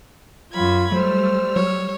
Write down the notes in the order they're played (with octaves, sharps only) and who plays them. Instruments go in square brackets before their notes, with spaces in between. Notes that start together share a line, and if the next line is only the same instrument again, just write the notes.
[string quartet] F#2 B5 G#6 [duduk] F4
[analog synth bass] F#3 [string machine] G3 E6 F6 [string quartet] A3 [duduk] C5
[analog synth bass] F#3 [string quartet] C#5